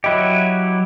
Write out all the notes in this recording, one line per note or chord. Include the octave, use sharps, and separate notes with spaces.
F#3 E4 G4 D#5 F#6